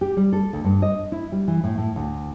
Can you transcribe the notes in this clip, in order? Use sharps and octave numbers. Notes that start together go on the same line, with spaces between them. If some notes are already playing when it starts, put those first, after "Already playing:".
G4
G3
A4
D2
G2
D#5
E4
G3
E3
A2
A2
D2